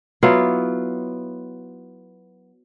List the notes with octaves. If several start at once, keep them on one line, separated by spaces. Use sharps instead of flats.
F#3 B3 E4 F4